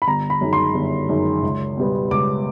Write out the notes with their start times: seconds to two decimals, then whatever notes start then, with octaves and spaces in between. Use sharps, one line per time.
0.02 B5
0.08 G1 A#5
0.30 B5
0.41 F#2 D#3 G#3
0.53 C6
0.75 G1
1.09 F#2 D#3 G#3
1.42 C#2
1.77 B2 G3 B3
2.11 C#2 D6